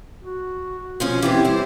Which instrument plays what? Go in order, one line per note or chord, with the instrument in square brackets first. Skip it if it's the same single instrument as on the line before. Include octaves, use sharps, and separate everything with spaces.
[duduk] F#4
[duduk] B2 [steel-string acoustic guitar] F3 G#3 C#4
[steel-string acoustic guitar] E3 B3 C4 [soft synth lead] G4
[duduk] G3 [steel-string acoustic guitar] E4 C5